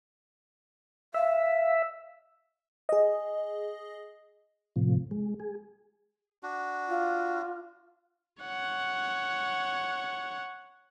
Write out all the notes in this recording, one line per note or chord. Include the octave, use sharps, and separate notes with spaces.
E5 F5
G#4 D#5
A2 C3 F3
G#3
G#4
D4 F#4
F4
C#5 F#5